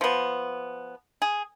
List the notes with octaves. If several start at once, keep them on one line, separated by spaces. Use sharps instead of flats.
F3 B3
G#4